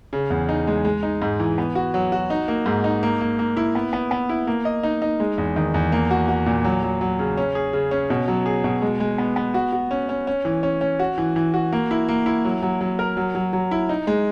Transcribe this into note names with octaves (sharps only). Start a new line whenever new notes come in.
C#3
E2
D#4
G#3
G#3
D#4
G#2
E3
B3
F#4
F#3
F#4
D#4
A#3
G#2
D#4
A#3
A#3
A#3
E4
B3
B3
B3
E4
A#3
D#5
D#4
D#4
G#3
E2
D#3
E2
A#3
F#4
F#4
A#2
F#3
F#3
F#3
C#3
C#4
G#4
C#3
C#4
B2
F#3
G#4
B2
G#3
G#3
B3
B3
F#4
F#4
C#4
C#4
C#4
E3
C#4
C#4
F#4
E3
E3
F#4
A#3
E4
A#3
E4
F#3
F#3
F#3
A#4
F#3
F#3
F#3
E4
D#4
G#3